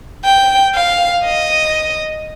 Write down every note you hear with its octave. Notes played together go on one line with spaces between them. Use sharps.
G5
F5
D#5